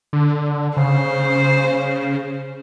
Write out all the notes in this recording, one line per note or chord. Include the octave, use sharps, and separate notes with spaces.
D3
C#3 C5